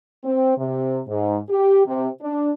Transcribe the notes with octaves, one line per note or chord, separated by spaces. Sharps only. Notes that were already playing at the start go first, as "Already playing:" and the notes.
C4
C3
G#2
G4
C3
D4